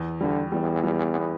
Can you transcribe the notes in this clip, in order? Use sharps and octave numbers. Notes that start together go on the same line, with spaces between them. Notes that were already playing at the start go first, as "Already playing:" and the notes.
Already playing: E2
D3 G3
E2 G3
G3
B3